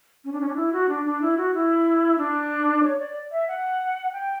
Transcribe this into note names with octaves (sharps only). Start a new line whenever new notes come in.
C#4
D4
C#4
D4
E4
F#4
D4
D4
E4
F#4
E4
D4
C#5
D5
E5
F#5
G5